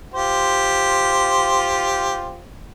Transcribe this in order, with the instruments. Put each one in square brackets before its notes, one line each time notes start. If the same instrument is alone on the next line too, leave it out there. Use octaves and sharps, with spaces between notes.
[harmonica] F4 G4 C5